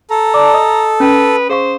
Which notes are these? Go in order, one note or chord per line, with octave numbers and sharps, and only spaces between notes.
A4 A#5
D5 A5 D6
D#5 D#6
C#4 B4 G5
G#4 C5 F5 C#6